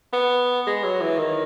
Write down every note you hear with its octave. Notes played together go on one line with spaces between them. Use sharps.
B3
G#3
F#3
E3
D#3